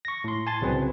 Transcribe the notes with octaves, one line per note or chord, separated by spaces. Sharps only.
C#6 A#6
A2 C6
G#5 A5 C6 A6
C2 C#3 F#3 C4 B4